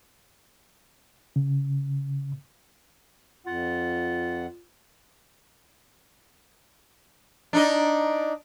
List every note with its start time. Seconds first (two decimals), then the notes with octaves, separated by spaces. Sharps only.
1.36 C#3
3.46 F2 F4 F#5
7.53 D4 D#4 D#5